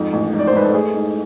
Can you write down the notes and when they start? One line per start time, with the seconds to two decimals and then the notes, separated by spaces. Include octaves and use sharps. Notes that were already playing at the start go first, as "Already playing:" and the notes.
Already playing: F2 G#2
0.13 A1
0.33 G#2
0.39 D5
0.47 C5
0.54 G#2 B4
0.65 A4
0.73 A3 G#4
0.94 G#2